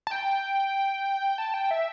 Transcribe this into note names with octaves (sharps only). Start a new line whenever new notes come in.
A5
G5
A5
G5
E5